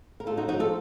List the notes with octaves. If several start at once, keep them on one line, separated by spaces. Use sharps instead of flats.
A#4
A2 F4 A4
D#4 F#4
F3 D#4 F#4
F4 A4